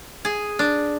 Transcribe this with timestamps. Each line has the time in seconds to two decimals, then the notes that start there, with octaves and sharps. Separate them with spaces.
0.25 G#4
0.59 D4